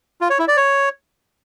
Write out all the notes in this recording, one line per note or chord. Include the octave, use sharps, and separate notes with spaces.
F4
C#5
E4
D5
C#5